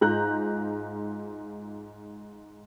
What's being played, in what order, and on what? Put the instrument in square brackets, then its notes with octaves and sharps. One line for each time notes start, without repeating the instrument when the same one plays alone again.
[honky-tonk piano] G#2 F4 A#5 F#6 G6